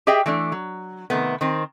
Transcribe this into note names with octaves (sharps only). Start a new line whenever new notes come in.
G4 G#4 D#5 E5 G5
E3 A3 D4
F#3
C3 D#3 A3 B3
D#3 C4